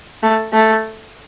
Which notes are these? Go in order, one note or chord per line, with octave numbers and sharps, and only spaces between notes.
A3
A3